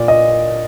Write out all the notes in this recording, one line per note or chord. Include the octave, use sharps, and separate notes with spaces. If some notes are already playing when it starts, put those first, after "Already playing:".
Already playing: A#2 D5
D#5